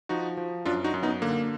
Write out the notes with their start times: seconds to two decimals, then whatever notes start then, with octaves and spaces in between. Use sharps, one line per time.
0.09 F3 D#4 F#4
0.37 F3
0.66 F#2 D4 F4
0.84 D#4 F#4
0.94 F#2
1.03 B3 D#4
1.22 D3 A#3